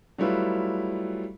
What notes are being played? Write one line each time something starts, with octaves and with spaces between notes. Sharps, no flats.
F#3 G3 A3 E4 F4 B4